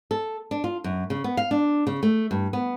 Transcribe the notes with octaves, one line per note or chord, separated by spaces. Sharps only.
A4
D4
F4
F#2
C#3
B3
F5
D4
C#3
A3
G2
B3